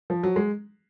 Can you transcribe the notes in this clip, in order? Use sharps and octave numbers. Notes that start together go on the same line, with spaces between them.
F3
F#3
G#3